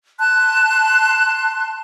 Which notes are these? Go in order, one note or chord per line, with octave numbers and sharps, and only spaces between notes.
A5 C6 F#6